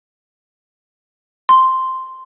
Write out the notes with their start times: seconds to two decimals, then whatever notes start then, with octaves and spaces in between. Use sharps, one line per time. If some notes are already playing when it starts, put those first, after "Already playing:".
1.49 C6